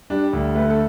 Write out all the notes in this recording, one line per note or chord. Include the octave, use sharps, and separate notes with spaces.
G3 D4
D2
A3 B4
A4